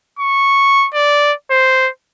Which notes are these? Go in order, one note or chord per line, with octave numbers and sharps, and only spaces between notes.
C#6
D5
C5